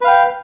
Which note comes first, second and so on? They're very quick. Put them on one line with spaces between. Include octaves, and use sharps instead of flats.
B4 F5 G5